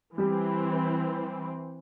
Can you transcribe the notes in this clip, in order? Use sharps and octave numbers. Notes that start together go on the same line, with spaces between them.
E3 G3 C4 G4